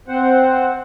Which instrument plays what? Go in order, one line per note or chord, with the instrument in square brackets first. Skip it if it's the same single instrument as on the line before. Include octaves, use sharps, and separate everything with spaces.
[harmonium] C4 C5 F#5